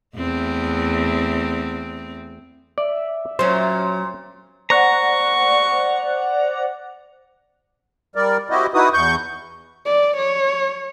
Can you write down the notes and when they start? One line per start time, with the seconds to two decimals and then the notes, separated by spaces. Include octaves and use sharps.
0.16 E2 A3 C4
2.78 D5 E5
3.39 A#2 F#3 C#4 C5
4.70 C5 D5 F#5 A#5 C#6
8.16 G3 A#4 D5
8.50 C4 E4 F#4 G4 D#5
8.74 D#4 E4 F#4 B4 D#6
8.94 E2 C#6 G6
9.85 D5
10.17 C#5